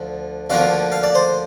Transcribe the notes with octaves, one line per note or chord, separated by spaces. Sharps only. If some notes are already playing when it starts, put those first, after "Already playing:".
Already playing: D2 D3 F3
D2 D3 F3 A#3 F5
F5
D5
C5